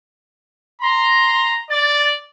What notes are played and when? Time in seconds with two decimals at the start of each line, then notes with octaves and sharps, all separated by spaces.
0.81 A#5 C6
1.70 D5 A6